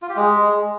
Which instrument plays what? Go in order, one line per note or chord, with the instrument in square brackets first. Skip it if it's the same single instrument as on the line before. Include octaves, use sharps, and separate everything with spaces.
[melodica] F4
G4
G#3